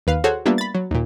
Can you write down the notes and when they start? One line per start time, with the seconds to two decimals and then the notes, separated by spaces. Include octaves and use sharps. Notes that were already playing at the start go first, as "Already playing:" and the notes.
0.07 D#2 B4 F5
0.24 F#4 G#4 A4 C5 C#5
0.45 G3 A#3 B3 D4 F4 E5
0.58 B5 A6
0.75 F#3
0.91 D#2 A#2